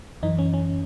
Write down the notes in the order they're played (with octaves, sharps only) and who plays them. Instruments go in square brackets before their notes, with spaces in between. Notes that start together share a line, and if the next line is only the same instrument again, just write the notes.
[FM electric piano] F#2 E3 D#4
C#4
C#4